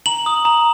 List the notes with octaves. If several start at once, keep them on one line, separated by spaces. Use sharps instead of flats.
A#5 F#7
D#6
A#5